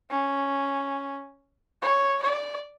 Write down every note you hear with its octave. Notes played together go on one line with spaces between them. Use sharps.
C#4
C#5
D5